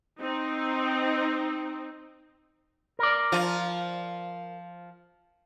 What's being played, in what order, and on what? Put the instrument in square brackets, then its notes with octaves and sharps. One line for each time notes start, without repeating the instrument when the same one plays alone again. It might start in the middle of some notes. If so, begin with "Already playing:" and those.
[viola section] C4 D#4
[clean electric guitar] A#4 D5
[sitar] F3 F4